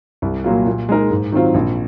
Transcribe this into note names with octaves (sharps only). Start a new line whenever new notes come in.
C2
A#2 F#3 A#3 F4
A#2
G#3 D#4 A#4
G#2
D#3 F#3 C4 F4
A#1